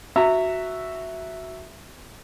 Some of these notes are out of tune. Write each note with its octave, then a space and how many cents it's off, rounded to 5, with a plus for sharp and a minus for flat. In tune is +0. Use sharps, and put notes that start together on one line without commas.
F#4 +0 E5 +0 A#5 -25